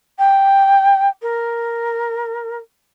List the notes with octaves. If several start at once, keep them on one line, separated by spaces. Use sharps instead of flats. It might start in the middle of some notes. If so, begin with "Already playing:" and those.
G5
A#4